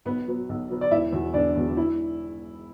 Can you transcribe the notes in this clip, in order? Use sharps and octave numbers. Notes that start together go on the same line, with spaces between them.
B1 B3 B4
B2 F#3 B3
B1
B2 F#3 B3
D5
E1 E4 E5
E2 B2 F#3
E1 D4 D5
E2 B2 F#3
E4